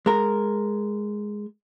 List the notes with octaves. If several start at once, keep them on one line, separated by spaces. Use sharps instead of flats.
G#3 A#4